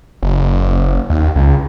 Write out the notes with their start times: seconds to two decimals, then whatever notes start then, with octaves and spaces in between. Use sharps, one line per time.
0.23 F#1
1.10 D#2
1.36 C#2